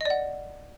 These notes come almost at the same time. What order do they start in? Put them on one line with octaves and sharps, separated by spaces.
D#5 D5 F#5